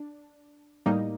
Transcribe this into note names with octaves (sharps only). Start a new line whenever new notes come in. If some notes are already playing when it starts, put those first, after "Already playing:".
Already playing: D4
A2 G3 A#3 D#4